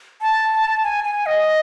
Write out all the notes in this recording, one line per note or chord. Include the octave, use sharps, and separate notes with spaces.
A5
G#5
G#5
D#5